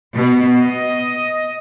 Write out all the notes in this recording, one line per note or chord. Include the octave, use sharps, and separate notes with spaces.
B2
D#5